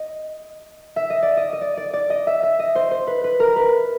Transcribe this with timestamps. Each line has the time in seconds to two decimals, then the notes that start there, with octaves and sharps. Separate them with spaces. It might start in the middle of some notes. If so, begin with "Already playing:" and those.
Already playing: D#5
0.96 E5
1.10 D#5
1.23 D5
1.37 D#5
1.53 D#5
1.62 D5
1.77 D5
1.93 D5
2.10 D#5
2.27 E5
2.43 E5
2.59 D#5
2.75 C5
2.91 C5
3.07 B4
3.24 B4
3.40 A#4
3.56 B4